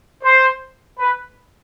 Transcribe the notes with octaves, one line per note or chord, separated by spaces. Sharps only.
C5
B4